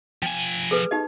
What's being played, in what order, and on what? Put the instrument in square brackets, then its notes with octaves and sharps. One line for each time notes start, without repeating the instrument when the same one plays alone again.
[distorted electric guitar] F3 G#5 [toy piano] G5
[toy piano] G#4 A4 B4
D#4 G4 D#5